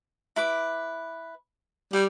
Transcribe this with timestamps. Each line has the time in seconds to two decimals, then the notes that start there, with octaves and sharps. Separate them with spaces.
0.36 E4 B4 D6
1.93 G3 G4